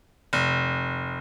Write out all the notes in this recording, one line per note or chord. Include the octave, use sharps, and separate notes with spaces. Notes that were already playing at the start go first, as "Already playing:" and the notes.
F1